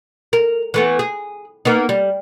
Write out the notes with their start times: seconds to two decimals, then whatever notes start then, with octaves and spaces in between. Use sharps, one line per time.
0.33 A#4
0.74 E3 A3 B3
0.99 G#4
1.65 A#3 B3 D#4
1.89 G3